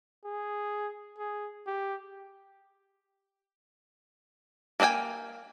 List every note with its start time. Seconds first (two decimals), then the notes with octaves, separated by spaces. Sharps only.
0.24 G#4
1.18 G#4
1.66 G4
4.80 A#3 B4 D#5 G5 G#5